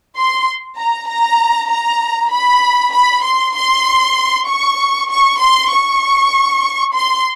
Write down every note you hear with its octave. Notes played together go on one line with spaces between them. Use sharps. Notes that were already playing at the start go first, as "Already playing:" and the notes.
C6
A#5
A#5
A#5
B5
B5
C6
C6
C#6
C#6
C6
C#6
C6